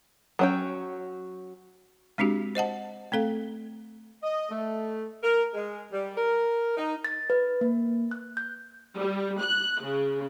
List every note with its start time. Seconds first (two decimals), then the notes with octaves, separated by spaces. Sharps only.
0.39 F#3 C#4 G5
2.18 G#3 C4 D4 F#4 G4
2.55 C5 D#5 F#5 A5
3.12 A3 C4 A4 F5
4.23 D#5
4.49 A3
5.23 A#4
5.53 G#3
5.92 G3
6.16 A#4
6.77 D#4
7.05 A6
7.30 B4
7.61 A#3
8.11 F#6
8.37 G6
8.97 G3
9.42 F#6
9.81 C#3